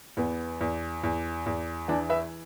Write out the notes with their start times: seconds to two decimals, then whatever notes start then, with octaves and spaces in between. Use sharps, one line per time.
0.17 E2 B3
0.61 E2
1.03 E2
1.46 E2
1.88 E3 D4
2.09 B4 E5